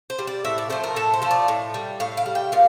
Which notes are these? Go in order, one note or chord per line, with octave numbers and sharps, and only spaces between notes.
C5
G3
D5
A2 E5
D5
F3 A3 C5
A#4
A2 A4
C5
F3 A3
D5
A2
G3
A2 F5
F5
G3
G5
A#2 F5